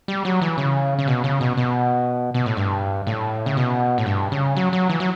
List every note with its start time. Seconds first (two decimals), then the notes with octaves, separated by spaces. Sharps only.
0.08 G3
0.25 F#3
0.42 E3
0.58 C#3
0.99 C#3
1.08 B2
1.24 C#3
1.41 B2
1.57 B2
2.34 B2
2.46 A2
2.57 G2
3.07 A2
3.46 C#3
3.57 B2
3.98 A2
4.06 G2
4.32 C#3
4.57 F#3
4.73 F#3
4.89 E3
5.00 F#3